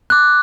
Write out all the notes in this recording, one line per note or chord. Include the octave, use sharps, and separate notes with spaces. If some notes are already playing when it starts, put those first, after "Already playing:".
D6 F#6